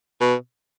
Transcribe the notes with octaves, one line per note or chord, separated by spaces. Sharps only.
B2